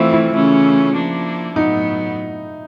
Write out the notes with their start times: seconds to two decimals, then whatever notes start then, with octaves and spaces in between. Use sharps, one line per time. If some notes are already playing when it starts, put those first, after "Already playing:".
Already playing: E3 A3 C4 E4 F4
0.13 E4
0.34 C#3 E3 A3 C#4
0.94 F3 A#3 D4
1.56 A2 F#3 B3 D#4